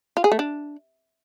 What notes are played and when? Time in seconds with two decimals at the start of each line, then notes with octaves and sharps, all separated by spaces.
0.17 F4
0.24 G#4
0.32 A3
0.39 D4